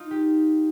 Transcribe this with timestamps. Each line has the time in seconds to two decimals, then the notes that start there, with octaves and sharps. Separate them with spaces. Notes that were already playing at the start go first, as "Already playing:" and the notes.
Already playing: D#4 F4
0.11 G4